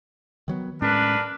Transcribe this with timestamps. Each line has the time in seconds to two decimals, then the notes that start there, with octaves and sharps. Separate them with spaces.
0.48 D#3 F#3 B3
0.82 A2 G#3 C#4 D4 A#4 B4